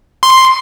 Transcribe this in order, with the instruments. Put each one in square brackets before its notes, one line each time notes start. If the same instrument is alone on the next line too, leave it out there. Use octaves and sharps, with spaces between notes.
[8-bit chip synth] C6